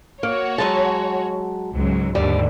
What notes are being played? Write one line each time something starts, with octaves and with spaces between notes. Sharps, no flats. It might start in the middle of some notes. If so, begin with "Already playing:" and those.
A#3 F#4 C#5
F#3 G#3 A5
C#2 G#2 F#3
D#2 G#2 D3 G3